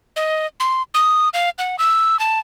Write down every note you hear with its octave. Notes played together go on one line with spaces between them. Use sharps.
D#5
C6
D#6
F5
F#5
E6
A5